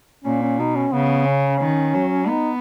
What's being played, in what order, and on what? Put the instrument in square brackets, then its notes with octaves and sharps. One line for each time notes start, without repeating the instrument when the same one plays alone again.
[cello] A#2 [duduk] C#4
[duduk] C#4
[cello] B2 [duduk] D#4
[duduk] C#4
[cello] C#3 [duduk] B3
[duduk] C#4
[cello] D#3
F#3
[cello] B3 [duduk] D#4